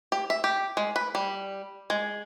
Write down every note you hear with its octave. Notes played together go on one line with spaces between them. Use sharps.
G4
E5
G4
G#3
B4
G3
G#3